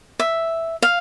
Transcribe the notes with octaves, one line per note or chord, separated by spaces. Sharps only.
E5
F5